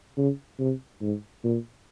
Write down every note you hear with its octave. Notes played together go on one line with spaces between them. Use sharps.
C#3
C3
G#2
A#2